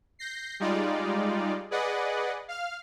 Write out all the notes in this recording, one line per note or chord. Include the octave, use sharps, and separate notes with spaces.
G6 A#6 C7
G3 G#3 D#4 F4 D5
G#4 B4 D5 D#5 F#5
F5 F6